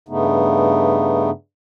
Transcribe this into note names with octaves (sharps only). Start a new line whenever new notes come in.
G2 C#3 A3 B3 D#4